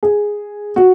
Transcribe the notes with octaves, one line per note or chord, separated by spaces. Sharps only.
G#4
F#4